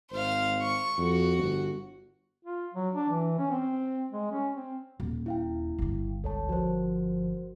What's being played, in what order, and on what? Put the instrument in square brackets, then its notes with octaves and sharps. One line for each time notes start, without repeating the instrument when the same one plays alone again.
[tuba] G#1 [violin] C5 F5
[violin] C#6
[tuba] F2 [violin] F#4
[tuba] G1
[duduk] F4
F#3
D4
E3
C#4
C4
G#3
C#4
C4
[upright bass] D#1
[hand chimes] E4 F5 G5
[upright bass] G1 D3
[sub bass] C#2 [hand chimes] A4 C#5 A5
[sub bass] F3 [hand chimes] F#4 A#4 C5